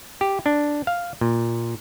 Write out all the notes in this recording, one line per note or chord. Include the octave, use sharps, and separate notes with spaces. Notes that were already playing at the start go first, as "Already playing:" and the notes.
G4
D4
F5
A#2